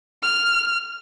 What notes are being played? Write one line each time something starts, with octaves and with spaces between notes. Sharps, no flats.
F6